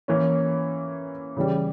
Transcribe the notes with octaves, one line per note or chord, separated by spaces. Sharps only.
E3 A#3 C#4
C#3 E3 G3